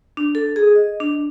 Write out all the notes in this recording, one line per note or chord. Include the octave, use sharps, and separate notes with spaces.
D4
A4
G#4
D#5
D4